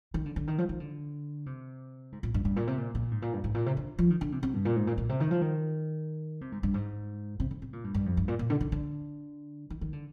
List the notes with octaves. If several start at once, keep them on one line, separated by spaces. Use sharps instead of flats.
D#3
D3
D3
D#3
F3
D#3
D3
C3
G#2
A#2
G2
G2
A#2
C3
A#2
A#2
G#2
A#2
G2
G#2
A#2
C3
D3
F3
D#3
D3
C3
C3
G2
A#2
G#2
A#2
A#2
C3
D#3
F3
D#3
C3
G#2
G2
G#2
C3
D3
C3
A#2
G2
G2
F2
G2
A#2
A#2
D3
D3
D3
D#3
D#3
D3